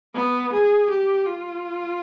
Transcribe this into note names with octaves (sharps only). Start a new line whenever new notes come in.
B3
G#4
G4
F4